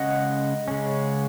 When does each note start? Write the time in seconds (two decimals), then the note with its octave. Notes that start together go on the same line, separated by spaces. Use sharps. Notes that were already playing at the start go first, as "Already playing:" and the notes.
Already playing: C#3 G#3 C#4 D#5 F#5
0.68 C#3 G#3 C#4